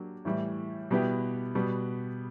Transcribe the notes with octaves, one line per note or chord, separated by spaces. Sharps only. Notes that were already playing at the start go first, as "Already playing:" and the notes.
Already playing: F#3 A#3 D4 G4
A2 E3 G3
B2 G3 B3 E4 G4
B2 G3 B3